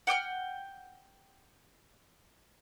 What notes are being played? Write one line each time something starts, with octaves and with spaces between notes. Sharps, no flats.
F#5 G5 D6 F6